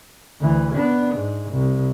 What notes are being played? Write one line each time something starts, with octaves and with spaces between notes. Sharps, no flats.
D2 E3
B3 D4
G#2
C2